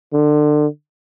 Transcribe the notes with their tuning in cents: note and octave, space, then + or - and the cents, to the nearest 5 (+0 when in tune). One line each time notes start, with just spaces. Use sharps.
D3 +30